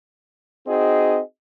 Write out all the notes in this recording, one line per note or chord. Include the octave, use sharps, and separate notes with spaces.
C4 D#4 F#4 G#4 D#5